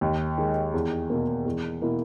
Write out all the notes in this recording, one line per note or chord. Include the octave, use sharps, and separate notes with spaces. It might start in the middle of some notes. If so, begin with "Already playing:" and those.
D#2
D#3 G#3
E2
B2 A#3
E2
B2 A#3 E4